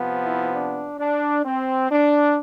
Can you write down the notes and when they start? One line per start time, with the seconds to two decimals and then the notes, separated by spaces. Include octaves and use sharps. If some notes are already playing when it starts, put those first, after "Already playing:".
Already playing: C3 F3 B3
0.23 E4
0.54 D4
0.98 D4
1.45 C4
1.90 D4